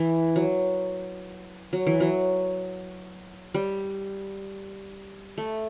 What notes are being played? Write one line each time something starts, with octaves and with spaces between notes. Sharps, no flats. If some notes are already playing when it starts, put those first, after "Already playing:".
Already playing: E3
F#3
F#3
E3
F#3
G3
A3